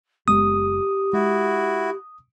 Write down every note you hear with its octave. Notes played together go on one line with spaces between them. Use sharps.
F#1 G#3 B3 G4 D#6
G#3 E4 F#4